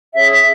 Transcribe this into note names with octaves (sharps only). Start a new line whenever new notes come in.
C#4 G#4 C#5 E5